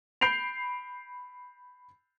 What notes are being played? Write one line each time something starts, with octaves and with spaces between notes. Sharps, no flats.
B5 G6 C7 D7 F7